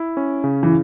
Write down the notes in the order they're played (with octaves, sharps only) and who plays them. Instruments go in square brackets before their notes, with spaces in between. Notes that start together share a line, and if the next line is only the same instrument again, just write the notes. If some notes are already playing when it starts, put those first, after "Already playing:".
Already playing: [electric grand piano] E4
C#4
C#3
[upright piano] E3